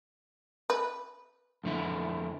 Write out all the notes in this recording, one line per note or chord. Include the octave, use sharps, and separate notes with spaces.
B4
F2 D3 E4